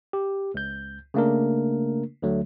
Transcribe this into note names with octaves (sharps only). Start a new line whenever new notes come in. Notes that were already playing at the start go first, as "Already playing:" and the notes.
G4
C#2 G6
C#3 A3 A#3 D4 A#4
D2 D3 F#3 A3